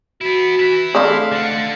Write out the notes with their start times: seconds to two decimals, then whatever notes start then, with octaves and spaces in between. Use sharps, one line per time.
0.21 B3 E4 F#4
0.59 E4 B4
0.95 G#3 A3 C4 D4 F5
1.32 D3 F#5